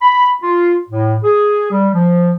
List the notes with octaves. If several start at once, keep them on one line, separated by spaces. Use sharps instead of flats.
B5
F4
A2
G#4
G3
F3